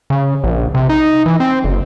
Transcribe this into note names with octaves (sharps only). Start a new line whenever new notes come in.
C#3
A#1
C3
D#4
E3
C4
F#1